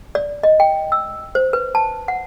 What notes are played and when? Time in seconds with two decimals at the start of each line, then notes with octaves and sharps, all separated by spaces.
0.15 D5
0.43 D#5
0.60 G5
0.92 E6
1.35 C5
1.53 B4
1.75 A5
2.08 F#5